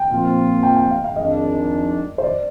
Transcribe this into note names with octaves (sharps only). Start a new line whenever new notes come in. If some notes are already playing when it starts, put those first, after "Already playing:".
Already playing: G5
A#2 F3 C4 F4
G5
G5
F5
F5
F2 D#3 G#3 D4 D#5
C5
D5